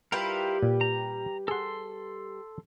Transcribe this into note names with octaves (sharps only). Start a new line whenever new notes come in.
G3 E4 F4 G4 A#4 B4
A#2
A#5
G#4 A4 F#5 C6